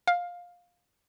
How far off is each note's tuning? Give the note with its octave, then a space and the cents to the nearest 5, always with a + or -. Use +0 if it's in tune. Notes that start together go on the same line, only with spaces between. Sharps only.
F5 +15